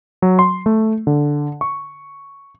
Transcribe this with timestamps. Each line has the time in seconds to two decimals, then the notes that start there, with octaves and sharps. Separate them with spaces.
0.22 F#3
0.39 C6
0.66 A3
1.07 D3
1.61 C#6